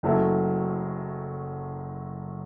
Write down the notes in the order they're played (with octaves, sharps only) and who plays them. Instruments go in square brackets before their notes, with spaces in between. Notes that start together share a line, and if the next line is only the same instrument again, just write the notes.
[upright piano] F#1 F#2 F#3 A3 E4